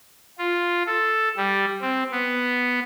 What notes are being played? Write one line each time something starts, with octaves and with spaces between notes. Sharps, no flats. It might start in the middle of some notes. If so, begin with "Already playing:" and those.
F4
A4
G3
C4
B3